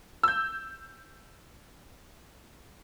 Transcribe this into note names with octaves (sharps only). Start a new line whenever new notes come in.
E6 G6